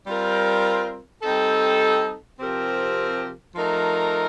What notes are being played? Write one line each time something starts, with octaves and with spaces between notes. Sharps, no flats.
G3 C4 F4 A#4
G3 C4 D#4 A4
C3 F3 C4 G4 A#4
F3 A3 D#4 A#4